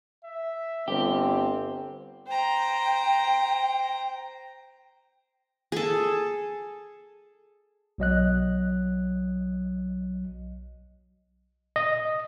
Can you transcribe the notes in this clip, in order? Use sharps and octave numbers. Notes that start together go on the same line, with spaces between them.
E5
G1 C4 G4
C5 G5 A#5
G#4 A4
B1 F#3 D#5 F#6
D#5